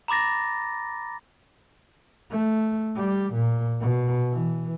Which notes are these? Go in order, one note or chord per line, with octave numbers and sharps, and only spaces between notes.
A#5 B5 D6 A6 A#6
A3
G3
A#2
B2
E3